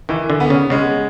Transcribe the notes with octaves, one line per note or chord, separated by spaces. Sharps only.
D#3 E3
D3
B3
C#3
C#3 G#3